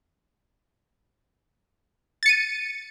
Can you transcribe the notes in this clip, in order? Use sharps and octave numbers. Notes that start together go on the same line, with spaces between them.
A6 C#7 D#7